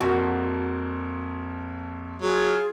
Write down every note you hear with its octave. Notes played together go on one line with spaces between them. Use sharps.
A#1 F2 A#3 F#4
F#3 F4 G#4